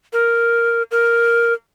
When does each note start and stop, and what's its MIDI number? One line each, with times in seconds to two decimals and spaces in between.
0.13 0.82 70
0.91 1.53 70